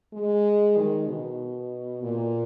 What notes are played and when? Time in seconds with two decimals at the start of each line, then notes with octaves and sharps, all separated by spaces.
0.13 G#3
0.77 D#3
1.08 B2
2.03 A#2